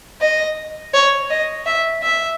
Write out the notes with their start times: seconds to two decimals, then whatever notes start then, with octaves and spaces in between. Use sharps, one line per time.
0.21 D#5
0.94 C#5
1.30 D#5
1.66 E5
2.03 E5